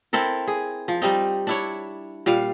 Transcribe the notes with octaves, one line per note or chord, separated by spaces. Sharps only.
C4 E4 A4 A#4
G#4
F3
G3 C4 D#4
D4 E4 C#5
A#2 G3 F5